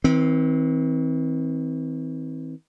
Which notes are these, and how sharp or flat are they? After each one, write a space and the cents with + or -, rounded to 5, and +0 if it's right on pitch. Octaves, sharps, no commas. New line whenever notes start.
E3 -45 C4 +0